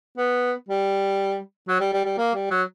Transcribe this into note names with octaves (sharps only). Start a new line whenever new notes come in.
B3
G3
F#3
G3
G3
G3
A#3
G3
F#3